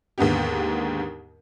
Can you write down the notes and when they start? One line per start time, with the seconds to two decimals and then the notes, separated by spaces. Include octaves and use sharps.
0.18 D#2 G#2 D3 B3 G4